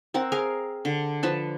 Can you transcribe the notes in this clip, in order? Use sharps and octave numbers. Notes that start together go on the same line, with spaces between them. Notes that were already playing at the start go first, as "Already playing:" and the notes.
C4 A#4 F#5
G#4 A#4 F5
D3
F3 B4 A5